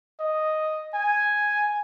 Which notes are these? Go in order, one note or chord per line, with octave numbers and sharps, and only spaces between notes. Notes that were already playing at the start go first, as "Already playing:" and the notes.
D#5
G#5